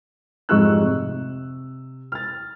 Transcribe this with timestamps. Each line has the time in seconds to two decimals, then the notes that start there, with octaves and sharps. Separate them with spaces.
0.49 F1 F2 G#2 C#6 E6 F#6
0.85 C3
2.12 F6 A6